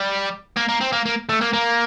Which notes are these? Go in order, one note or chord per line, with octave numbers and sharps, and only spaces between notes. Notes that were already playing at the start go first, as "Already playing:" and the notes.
Already playing: G3
A#3
A#3
C4
A#3
A#3
A3
A#3
A#3